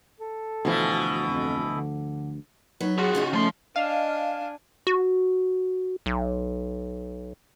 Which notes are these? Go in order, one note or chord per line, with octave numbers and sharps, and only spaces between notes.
A4
D2 B2 E3 F3
F2
D3
F#3 B3 D#4 B4
F4 F#4 G#4
C#3 C#4 D#4
F3 A3 C6
D4 D#5 F5 G#5
F#4
B1